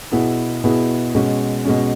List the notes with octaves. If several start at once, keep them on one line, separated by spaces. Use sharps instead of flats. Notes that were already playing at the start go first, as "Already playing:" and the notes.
B2 B3 E4 G#4
B2 B3 E4 G#4
B2 G#3 C#4
B2 G#3 C#4